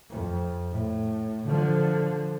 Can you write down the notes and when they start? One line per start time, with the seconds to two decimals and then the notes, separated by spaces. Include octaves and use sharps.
0.10 F2
0.71 A2
1.48 D3 F3